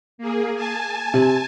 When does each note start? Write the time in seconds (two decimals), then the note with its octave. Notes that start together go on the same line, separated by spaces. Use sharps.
0.18 A#3 G#4
0.55 G#5 A5
1.14 C3